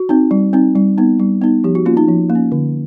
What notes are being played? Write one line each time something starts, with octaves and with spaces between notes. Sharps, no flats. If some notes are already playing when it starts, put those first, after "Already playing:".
Already playing: F#4
C4 D#4
G3
C4 D#4
G3
B3 D#4
G3
B3 D#4
F3 G4
F#4
A#3 C#4 F4
D#4
F3
A#3
C#4
D3